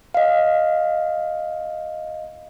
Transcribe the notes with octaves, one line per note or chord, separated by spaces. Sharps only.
D#5 F5